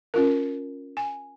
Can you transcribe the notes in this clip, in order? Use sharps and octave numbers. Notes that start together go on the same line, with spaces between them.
C#4 F4 A#4
G#5